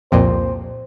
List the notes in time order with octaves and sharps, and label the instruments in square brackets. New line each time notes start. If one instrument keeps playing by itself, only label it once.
[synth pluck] C2 F2 A#2 [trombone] C5